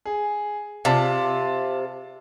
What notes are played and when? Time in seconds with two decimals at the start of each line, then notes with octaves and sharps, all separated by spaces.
0.06 G#4
0.85 C3 F4 D5 A5